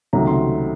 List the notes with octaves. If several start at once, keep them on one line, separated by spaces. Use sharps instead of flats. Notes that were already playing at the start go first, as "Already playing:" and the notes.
C#2 C3 D#3 F#3 A3 A#5
C6